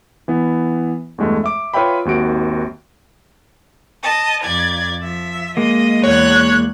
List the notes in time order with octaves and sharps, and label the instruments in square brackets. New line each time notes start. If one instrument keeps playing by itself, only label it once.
[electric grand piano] E3 B3
E2 G2 G#3 A3
E5 D6
F4 B4 C#5 E5 G5 B5
G#1 D#2 F#4 D7
[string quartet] D#5 A5
F2 D5 G#6
F3 E5
[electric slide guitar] G#3 A#3 [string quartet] D#5
[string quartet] E2 F#6 G#6 [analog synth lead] C#5